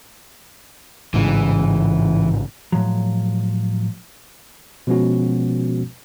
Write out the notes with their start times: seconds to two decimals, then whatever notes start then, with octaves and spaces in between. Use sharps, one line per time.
1.14 A1 G#2 C#3 E3
2.72 A2 F3 F#3
4.87 B2 F3 G#3 B3 C#4 F#4